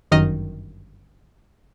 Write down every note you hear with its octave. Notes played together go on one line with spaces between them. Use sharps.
G1 F#2 D#3 D#5 F6